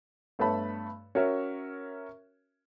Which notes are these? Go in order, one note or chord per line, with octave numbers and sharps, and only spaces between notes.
G2 A3 B3 C#5 A5 B5
C#4 F#4 A#4 C#5 E5